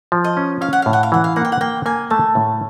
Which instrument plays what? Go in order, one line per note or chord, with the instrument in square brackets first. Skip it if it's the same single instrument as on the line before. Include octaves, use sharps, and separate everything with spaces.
[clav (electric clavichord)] F3
[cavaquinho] D#5
[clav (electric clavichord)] C#4
[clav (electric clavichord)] C#4 [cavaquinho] F5
[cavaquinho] F#5
[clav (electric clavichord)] A2 [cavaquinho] F5
[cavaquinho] F#5
F5
[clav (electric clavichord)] E3 [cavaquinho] F#5
[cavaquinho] F5
[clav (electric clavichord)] A#3 [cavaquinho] F#5
[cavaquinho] G5
F#5
[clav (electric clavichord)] A#3 [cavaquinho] G5
[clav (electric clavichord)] A#3 [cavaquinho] G#5
[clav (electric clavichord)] A3 [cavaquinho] A5
[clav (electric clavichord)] A2